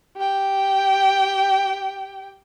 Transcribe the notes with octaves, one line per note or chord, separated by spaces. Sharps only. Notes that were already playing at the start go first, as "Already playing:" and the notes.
G4 G5